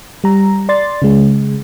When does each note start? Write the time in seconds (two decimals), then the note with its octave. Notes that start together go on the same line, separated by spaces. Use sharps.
0.24 G3 A#5
0.69 D5 C6 A6
1.02 C#3 G#3